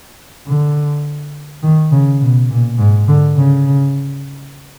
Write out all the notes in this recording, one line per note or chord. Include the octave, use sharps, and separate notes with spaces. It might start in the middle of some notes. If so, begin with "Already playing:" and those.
D3
D#3
C#3
B2
A#2
G#2
D3
C#3